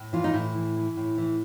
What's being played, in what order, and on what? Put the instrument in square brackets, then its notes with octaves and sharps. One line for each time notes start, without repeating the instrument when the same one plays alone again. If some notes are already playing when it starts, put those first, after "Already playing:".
Already playing: [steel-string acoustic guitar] A2
E3 F4
D#4
A2 E4
E3
E3
A2
E3